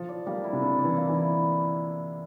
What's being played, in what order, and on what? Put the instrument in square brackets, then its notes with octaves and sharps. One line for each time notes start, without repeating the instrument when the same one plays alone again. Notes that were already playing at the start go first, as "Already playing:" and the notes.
Already playing: [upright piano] F3 [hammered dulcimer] A4
[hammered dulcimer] D5
[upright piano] G3 [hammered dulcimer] A#3
[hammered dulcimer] E4
[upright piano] C3
[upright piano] D3 [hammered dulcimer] A4
[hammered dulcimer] D5
[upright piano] E3
[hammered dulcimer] A#3
[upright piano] E3
[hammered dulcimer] E4